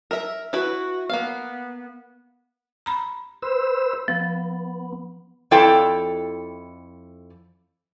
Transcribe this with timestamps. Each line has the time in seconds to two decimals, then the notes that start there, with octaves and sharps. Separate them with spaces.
0.11 A#4 E5
0.53 E4 F#4 B4
1.09 A#3 B3 F5
2.86 A#5 B5
3.42 B4 C5 E6
4.08 F3 B3
5.51 F2 E4 A4 D5 F5 G5